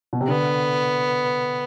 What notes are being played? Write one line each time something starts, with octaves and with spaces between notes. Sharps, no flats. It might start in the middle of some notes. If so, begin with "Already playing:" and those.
B2
C3
D3 B3